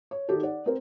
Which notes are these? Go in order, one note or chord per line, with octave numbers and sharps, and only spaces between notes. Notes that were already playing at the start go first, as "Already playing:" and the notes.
C#5
D#3 D#4 F#4 G4 A4
D5 F#5
C4 A#4